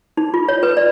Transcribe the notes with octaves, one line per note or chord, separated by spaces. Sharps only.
D#4
F4
C#5
B4
D5